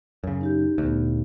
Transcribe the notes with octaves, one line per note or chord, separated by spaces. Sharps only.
F#2 C#3
D#4 G4 G6
D2 A#2 B3